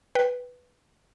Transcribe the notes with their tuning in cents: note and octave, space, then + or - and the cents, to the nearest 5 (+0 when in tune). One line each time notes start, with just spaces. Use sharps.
B4 +0 G5 +0